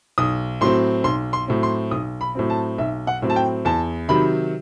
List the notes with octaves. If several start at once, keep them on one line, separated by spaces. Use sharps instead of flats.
B1 D#6
A2 F#3 C4 C6
B1 C6
C6
A2 F#3 C4
C6
B1 D#6
B5
A2 F#3 C4
A5
B1 E5
F#5
A2 F#3 C4
A5
G5
E2 A5
C3 D#3 F#3 B5